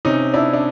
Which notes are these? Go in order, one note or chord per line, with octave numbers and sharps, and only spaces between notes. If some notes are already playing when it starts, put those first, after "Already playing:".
C3 C#4 D#4
D4 E4
D4